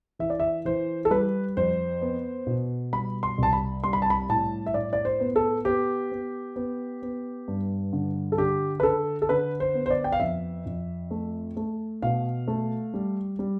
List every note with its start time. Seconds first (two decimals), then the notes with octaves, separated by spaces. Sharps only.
0.19 E3 E5
0.30 D5
0.40 E5
0.65 E3 C5
1.05 A4
1.10 G3 B4
1.57 F2 C5
2.02 B3
2.47 B2
2.93 G3 B5
3.23 C6
3.38 C2 A5
3.53 B5
3.84 G3 C6
3.93 B5
4.02 A5
4.10 B5
4.29 A2 A5
4.66 E5
4.74 A2 D5
4.93 D5
5.05 C5
5.20 B3
5.36 A4
5.65 B3 G4
6.12 B3
6.56 B3
7.03 B3
7.48 G2
7.93 D3
8.32 A4
8.38 D3 G4
8.80 B4
8.83 D3 A4
9.22 A4
9.29 D3 B4
9.60 C5
9.74 B3
9.86 C5
9.90 D5
10.04 G5
10.12 F5
10.20 F2 E5
10.66 F2
11.11 A3
11.57 A3
12.02 B2 F5
12.48 A3
12.94 G3
13.39 G3